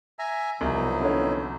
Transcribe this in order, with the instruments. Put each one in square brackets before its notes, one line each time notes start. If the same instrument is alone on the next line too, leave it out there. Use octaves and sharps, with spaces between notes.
[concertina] E5 G#5 A#5
[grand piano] C2 [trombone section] B2 F3 F#3 [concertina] D#4 E4
[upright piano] D3 C#4